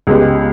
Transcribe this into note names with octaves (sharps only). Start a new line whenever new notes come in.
C#2 C#3 G#3 B3 G4